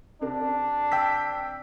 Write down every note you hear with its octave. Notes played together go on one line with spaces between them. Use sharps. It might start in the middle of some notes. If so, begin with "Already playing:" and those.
C3 C4 D4 A#4
G5 E6 B6